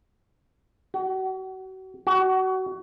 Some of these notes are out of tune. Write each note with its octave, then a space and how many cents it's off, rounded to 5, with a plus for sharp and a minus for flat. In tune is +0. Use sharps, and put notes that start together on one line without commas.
F#4 +35
F#4 +25